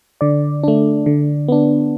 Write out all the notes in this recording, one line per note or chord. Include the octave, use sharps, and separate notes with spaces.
D3 D5
A3 D4
D3
B3 D4